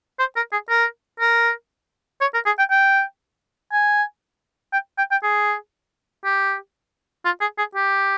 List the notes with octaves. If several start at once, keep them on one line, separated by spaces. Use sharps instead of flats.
C5
A#4
G#4
A#4
A#4
C#5
A#4
G#4
G5
G5
G#5
G5
G5
G5
G#4
G4
F4
G#4
G#4
G4